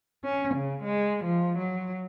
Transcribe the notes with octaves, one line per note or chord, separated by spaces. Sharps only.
C#4
C#3
G#3
F3
F#3